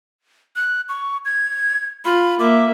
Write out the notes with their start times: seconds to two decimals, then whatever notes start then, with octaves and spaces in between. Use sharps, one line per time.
0.56 F#6
0.89 C#6
1.25 G#6
2.05 F4 B5
2.39 A#3 E5 D6